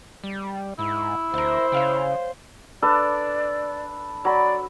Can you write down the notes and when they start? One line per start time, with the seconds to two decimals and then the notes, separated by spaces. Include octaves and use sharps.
0.24 G3
0.79 G#2 E4
1.34 D2 A#4 C5 E5
1.72 C#3 C#5 F5 G5
2.82 D4 A4 B4 D5
4.25 F#3 D5 B5